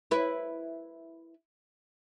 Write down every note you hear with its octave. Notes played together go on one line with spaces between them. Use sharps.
E4 B4